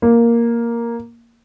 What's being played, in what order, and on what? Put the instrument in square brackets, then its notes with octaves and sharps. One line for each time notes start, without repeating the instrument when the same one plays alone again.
[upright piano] A#3